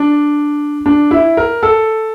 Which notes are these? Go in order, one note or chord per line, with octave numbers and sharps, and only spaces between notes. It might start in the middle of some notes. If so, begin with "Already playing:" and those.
Already playing: D4
D4
E4
A#4
A4